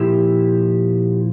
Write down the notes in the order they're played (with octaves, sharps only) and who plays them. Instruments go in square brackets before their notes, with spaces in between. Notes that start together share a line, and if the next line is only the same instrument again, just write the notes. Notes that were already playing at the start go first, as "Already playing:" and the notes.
Already playing: [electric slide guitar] A#2 F3 E4 G4